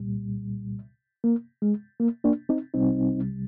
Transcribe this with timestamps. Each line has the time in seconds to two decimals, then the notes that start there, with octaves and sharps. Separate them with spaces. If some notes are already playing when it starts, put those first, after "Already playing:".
Already playing: C2 A#2 G3
1.24 A#3
1.62 G#3
2.00 A#3
2.24 A#3 D4
2.49 C4 D#4
2.74 C2 C3 G3 C4 D#4